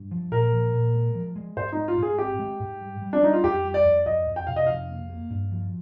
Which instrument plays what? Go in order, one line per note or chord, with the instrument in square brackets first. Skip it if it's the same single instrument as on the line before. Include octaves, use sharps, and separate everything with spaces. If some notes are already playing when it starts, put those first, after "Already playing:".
Already playing: [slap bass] G2
F3
[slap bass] A#2 [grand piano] A#4
[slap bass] F3
A#2
G#3
F3
G#3
[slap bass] G#2 [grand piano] C5
[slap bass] G#3 [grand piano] D#4
[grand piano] F4
[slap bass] G#2 [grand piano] G#4
[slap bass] C4 [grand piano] G4
[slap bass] G#3
G#2
G3
G3
[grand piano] D4
[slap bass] G3 [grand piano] D#4
[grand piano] F4
[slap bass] F2 [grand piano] G4
[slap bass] G3
[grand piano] D5
[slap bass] F2
[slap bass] F2 [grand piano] D#5
[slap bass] F2
[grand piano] G5
[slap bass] C3 [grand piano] F5
[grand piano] D#5
[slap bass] F2 [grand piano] F5
[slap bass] A#3
A#3
G2
F3